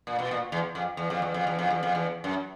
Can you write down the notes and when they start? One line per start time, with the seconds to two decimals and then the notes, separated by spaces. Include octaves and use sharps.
0.07 A#2
0.19 B2
0.31 A#2
0.52 E2
0.75 F2
0.97 E2
1.10 F2
1.22 E2
1.34 F2
1.47 E2
1.59 F2
1.70 E2
1.83 F2
1.95 E2
2.24 F#2